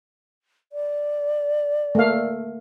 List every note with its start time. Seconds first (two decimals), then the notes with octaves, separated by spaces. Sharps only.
0.73 D5
1.95 A3 A#3 F5